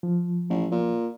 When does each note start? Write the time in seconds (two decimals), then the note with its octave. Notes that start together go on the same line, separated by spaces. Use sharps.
0.03 F3
0.50 A1
0.72 A#2